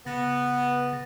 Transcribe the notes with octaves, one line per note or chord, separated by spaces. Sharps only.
C#3 B3 A6 A#6